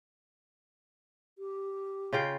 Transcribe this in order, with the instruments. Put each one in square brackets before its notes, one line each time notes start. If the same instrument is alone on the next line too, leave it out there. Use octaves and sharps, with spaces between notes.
[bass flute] G4
[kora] C#3 F4 G5